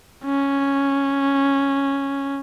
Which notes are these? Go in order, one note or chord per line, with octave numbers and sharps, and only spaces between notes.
C#4